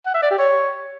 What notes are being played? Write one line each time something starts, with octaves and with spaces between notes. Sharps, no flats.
F#5
E5
D5
G4
C#5